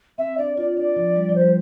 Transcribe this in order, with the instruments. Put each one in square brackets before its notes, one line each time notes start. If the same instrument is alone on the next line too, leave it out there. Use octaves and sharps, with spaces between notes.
[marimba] C4 [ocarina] E5
[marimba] D4 [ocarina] D5
[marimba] F4 [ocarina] D5
[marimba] D4 [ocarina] D5
[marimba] F3
G3
F3
[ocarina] C5
[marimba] G3